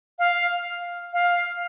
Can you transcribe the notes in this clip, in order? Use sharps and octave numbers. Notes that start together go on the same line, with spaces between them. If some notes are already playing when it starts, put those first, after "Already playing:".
F5
F5